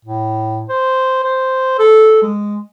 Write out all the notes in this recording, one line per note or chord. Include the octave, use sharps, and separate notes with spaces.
A2
C5
C5
A4
G#3